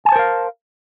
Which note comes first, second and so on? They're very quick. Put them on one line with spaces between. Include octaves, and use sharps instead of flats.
G#5 A5 C5 A#4 F5